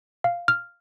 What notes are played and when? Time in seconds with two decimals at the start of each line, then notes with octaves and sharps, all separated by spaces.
0.24 F5
0.48 F6